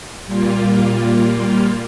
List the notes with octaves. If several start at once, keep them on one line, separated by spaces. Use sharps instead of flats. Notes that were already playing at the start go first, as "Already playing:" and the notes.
A#2 G3 A#3 F4